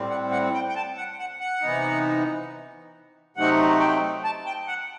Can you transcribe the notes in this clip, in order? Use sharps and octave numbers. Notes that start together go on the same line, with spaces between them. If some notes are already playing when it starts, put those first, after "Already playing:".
Already playing: A2 G3 C4
F#5
F#5
G5
G5
A5
F#5
F#5
F#5
C3 E3 B3 D#4
C3 F#3 A3 C4 D#4 F#5
G5
A5
G5
F#5